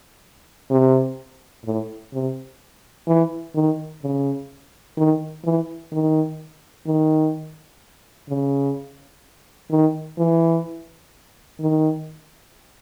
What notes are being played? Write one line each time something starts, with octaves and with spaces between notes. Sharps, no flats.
C3
A2
C3
E3
D#3
C#3
D#3
E3
D#3
D#3
C#3
D#3
E3
D#3